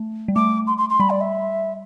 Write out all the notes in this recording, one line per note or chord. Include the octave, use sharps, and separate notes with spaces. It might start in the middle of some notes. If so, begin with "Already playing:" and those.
Already playing: A3
G3
A3 D6
C6
C6
C6
G3 B5
D5
E5